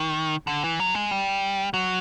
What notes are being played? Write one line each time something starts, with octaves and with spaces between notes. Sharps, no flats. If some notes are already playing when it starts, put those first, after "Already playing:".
Already playing: D#3
D3
E3
F#3
G#3
G3
F#3